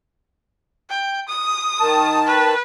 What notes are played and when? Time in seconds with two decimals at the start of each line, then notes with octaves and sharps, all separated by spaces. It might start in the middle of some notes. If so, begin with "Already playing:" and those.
0.90 G5
1.29 D#6
1.80 D#3 A5
2.27 B4